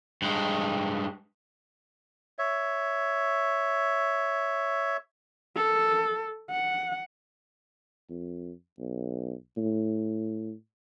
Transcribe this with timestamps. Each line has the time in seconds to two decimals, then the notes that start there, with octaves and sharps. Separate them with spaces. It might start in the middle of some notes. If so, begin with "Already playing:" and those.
0.22 G2 G#3
2.39 C#5 E5
5.56 A4
6.51 F#5
8.10 F2
8.79 B1
9.57 A2